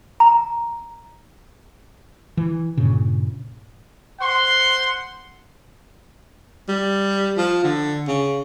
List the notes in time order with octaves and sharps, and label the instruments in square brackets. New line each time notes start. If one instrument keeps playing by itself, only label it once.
[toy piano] A#5
[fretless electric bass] E3
G2 A#2 C#3
[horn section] C5 F#5 C6
[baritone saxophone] G3
F3
D3
C#3